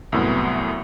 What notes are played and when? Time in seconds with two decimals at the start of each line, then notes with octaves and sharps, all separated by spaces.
0.12 C2 F#2 A2 B3